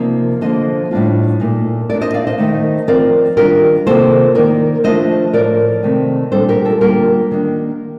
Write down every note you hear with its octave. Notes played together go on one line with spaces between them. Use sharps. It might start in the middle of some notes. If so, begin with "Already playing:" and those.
Already playing: C3 F3 A#3 D#4 D5
D3 F3 A#3 C5 D#5
A2 G3 A#3 D4 F4
A#2 A3 D#4
A#2 A3 D4 A#4 D5
C5 D#5
D5 F5
C5 D#5
D#3 A3 D#4
F3 C4 F4 A#4 D5
D#3 G3 D4 F4 G4 A#4
C3 D#3 A#3 F4 A4 C5
D#3 A#3 D#4 A#4 D5
F3 A3 D4 F4 C5 D#5
A2 F3 A3 A#4 D5
C3 D#3 A3 C4
A#2 G3 D4 A4 C5
G4 A#4
F4 A4
D3 G3 A#3 D4 F4 G4 A#4
D#3 A#3 D4